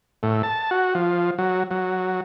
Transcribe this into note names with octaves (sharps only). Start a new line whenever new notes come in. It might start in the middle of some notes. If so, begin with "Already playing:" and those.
A2
A5
F#4
F3
F#3
F#3